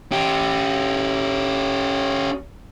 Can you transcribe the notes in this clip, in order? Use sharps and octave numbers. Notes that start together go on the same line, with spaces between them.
C#4 G4